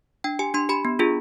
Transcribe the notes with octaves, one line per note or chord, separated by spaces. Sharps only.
D4 G5
G4 G#5
D4 C6
G4 B5
B3
D4 F4 G#4